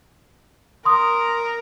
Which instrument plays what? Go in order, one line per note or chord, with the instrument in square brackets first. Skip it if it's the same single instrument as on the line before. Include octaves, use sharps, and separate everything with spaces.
[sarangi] A#4 [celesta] C6 D#6